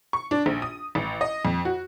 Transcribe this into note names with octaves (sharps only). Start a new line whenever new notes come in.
C#6
D4
A#1
D#6
A1
D#5
F2
F#4